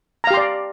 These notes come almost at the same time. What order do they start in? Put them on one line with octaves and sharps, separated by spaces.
A#5 F5 G4 C6 D5